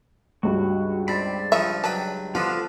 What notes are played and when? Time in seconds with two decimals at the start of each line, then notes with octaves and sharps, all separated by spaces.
0.43 C#2 G2 F#4
1.08 C4 D5 B5
1.52 F3 D#4 C#5 E5
1.84 F#3 B4 G5 A5
2.35 D3 F3 B3 F4 A4